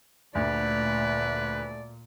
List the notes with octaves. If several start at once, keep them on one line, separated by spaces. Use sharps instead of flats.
D2 A#2 A3 B4 D5